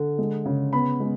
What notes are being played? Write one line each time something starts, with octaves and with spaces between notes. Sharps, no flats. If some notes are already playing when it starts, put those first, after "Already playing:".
Already playing: D3
G#3
C#3
B3 B5
G#3